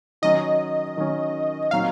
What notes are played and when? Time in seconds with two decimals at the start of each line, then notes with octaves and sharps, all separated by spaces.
0.22 D#3 F#3 C#4 D#5
0.97 D#3 F#3 C#4
1.71 A#2 F#3 C4 D#4 F5